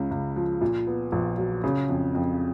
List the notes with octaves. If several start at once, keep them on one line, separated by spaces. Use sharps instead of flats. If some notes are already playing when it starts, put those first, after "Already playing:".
Already playing: C#2 C#3
C#2
F3
A#2
B3
A#1
F#3
C#3
F2
F2